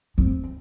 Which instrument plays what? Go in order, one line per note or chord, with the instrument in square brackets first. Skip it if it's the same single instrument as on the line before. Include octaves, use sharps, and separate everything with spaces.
[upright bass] C4